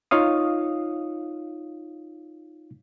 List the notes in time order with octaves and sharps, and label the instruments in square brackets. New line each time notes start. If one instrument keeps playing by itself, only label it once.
[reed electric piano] D#4 F4 C#5 F5 D#6